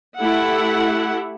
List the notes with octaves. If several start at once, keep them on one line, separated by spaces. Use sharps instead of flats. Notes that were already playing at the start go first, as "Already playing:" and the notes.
A3 E4 G4 E5 F#5